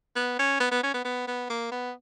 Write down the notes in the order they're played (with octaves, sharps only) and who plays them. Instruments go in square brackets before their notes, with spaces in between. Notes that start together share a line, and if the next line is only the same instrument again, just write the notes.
[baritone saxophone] B3
C#4
B3
B3
C#4
B3
B3
B3
A#3
B3